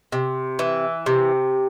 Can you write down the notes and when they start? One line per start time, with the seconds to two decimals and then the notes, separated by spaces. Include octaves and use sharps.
0.12 C3
0.59 E3
1.06 C3